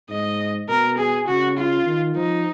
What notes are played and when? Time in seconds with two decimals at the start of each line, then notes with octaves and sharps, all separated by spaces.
0.09 G#2 D#5
0.69 B2 A#4
0.98 G#4
1.27 C#3 F#4
1.57 F4
1.86 D#3
2.16 F3 D#4